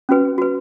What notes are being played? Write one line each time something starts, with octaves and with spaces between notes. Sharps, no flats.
C#4 F#4 B4
F#4 B4